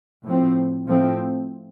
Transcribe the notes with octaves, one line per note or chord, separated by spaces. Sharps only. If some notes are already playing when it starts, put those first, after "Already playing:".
A2 F3 C4
A2 F3 A3 C4